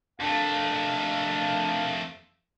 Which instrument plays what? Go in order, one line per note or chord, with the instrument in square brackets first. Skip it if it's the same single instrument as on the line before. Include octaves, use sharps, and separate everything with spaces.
[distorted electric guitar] F2 A3 [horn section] D4 A#4 F5